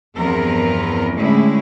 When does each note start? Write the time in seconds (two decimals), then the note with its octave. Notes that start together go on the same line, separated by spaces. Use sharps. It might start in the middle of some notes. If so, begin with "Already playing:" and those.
0.15 E2 G2 F3 B3 C4 A#4
1.14 A2 D3 G3 G#3 C#4 E4